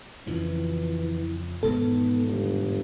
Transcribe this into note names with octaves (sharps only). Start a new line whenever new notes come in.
F2 C#3 E3 F3
E1 G#2 D#3 B3 A4
G1